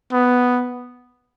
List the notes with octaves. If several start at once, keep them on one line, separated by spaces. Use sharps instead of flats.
B3